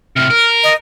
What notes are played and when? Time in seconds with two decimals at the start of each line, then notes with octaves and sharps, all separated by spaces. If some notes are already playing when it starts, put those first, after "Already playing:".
0.16 A2 C3 F6
0.31 A#4
0.64 D#5